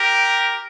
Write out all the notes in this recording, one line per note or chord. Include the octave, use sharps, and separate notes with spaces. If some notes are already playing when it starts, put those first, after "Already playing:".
Already playing: G4 A#4